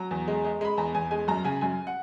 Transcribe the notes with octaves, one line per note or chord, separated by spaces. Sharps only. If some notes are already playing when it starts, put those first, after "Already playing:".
Already playing: F#3 A#5
E2
G#3
G#3
G#3 B5
E2 A#5
E2 G#5
G#3 G#5
F#2 A#5
C#3 G#5
F#2 G#5
F#5